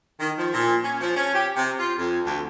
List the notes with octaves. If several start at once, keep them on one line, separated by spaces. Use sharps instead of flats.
D#3
F3
A#2
C#4
F3
C#4
G4
C3
F4
F2
D2